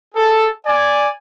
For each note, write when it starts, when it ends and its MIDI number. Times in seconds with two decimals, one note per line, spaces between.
0.15 0.46 68
0.15 0.46 69
0.65 1.08 74
0.65 1.08 80